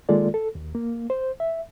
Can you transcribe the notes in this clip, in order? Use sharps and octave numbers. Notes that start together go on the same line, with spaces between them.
D#3 G#3 A#3 F4 A4 D5
A4
D#2
A#3
C5
E5